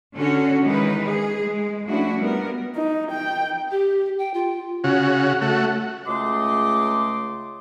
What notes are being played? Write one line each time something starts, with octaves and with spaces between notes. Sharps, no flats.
D3 C#4 F#4
D#3 E3 G#3 D#4 B4
G#4
G#3
F3 A3 C#4 D4 E4 F#4
G3 B3 A#4
D#4
G5
G4
G5
F4
C#3 F#4
A3 F#4
C#2 C#3 A3 D#5 C6 D6